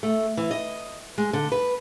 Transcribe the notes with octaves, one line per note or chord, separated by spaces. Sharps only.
A3
E3
D#5
G#3
D3
B4